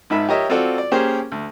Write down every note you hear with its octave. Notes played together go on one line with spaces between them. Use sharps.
G#1 G#2 D#3 E5 B5
G4 A#4 C#5 D#5 E5
C4 F4 F#4 A4 D5
D5
A#3 C#4 G4 G#4 A#4 C5
D2